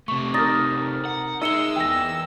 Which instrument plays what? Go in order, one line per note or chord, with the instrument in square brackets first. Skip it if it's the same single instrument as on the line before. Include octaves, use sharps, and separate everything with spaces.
[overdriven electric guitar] C3 A3 [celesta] C#6
[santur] D#4 A#4 [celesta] D#6 A6 A#6
[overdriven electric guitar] F#5
[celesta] D#4 C#7 G7 [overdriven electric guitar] G#4 D#5 [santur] E5 [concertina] E6
[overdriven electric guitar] E2 B3 [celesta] G5 A#6